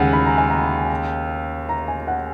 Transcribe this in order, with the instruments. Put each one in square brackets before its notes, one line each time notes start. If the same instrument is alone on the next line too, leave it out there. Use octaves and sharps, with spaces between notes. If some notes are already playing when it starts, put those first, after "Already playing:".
Already playing: [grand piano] D#2 C#3 G#3 [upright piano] F#5 G#5 B5
[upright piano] B5
A#5
G#5
A#5
A#5
G#5
F#5